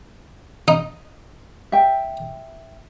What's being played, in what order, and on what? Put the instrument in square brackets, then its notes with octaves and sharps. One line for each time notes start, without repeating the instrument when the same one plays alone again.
[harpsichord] D#4
[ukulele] E5 G5